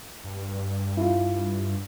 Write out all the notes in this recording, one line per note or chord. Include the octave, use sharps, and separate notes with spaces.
G2
E4 F4